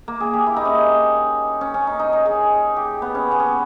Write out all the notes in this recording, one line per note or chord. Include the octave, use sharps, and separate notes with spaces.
A#3
G#4
G4
E4
D#4
C#4
D#4
C#4
C#4
D#4
D#4
D#4
G#4
G4
B3
C#4
B3
C#4